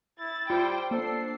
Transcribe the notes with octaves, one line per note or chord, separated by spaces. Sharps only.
E4 A6
G3 F4 C5 G5
A#3 D4 A4 C5 C7